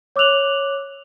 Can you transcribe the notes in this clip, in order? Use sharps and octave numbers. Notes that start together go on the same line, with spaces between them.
C#5 D6 E6 F#6 F7 F#7